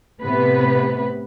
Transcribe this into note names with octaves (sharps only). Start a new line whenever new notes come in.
A2 C3 B3 B4